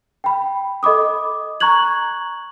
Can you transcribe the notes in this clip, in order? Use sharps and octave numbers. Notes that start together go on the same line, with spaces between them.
G5 B5
A4 D#5 B5 D6 D#6
A#5 C#6 F#6 G#6 F#7